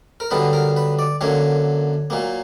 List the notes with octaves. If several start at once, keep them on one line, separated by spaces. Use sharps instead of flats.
A#4
G2 D3 F#3 B3 B4
A#4
B4
D5
F#2 D3 F#3 A#3 C#5
A#2 F#3 A#3